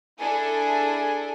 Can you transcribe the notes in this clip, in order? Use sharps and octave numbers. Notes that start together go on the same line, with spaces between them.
D4 E4 G#4 A4 G#5